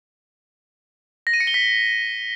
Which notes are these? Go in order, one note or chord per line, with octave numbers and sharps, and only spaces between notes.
A#6
D#7
C#7
G7
B6